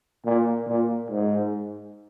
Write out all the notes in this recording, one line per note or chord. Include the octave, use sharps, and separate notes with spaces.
A#2
A#2
G#2